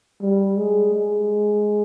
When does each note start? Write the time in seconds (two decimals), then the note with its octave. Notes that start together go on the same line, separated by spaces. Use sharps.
0.21 G3
0.57 G#3
0.94 G#3